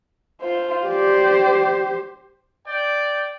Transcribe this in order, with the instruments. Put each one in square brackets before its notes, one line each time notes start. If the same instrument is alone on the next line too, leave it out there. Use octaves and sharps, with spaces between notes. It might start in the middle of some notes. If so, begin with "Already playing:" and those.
[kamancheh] F4 C5
[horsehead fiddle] G4 C5 [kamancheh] D5
[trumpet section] D5 G5